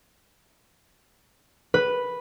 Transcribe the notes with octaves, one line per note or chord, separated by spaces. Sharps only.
B4